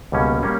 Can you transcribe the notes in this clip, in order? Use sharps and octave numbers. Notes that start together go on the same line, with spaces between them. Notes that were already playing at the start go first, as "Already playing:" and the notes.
C#2 B2 G3 A#3 C#4
G3 A#3 C#4